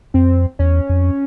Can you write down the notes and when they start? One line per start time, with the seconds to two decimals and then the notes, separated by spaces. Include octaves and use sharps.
0.14 F2 C4
0.59 E2 C#4
0.89 F2